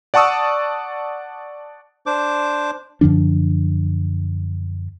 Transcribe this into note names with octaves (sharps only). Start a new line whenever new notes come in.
D5 F#5 A5 C#6 D#6 E6
D4 C5 D6
F#2 D3 F3 D4